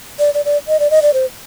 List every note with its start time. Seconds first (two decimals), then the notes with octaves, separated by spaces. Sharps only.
0.19 D5
0.34 D5
0.45 D5
0.68 D#5
0.80 D5
0.91 D#5
1.02 D5
1.14 C5